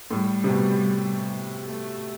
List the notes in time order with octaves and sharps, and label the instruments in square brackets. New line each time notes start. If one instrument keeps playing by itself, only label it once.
[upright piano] A2 [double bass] G3
[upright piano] C3
B2
[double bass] A3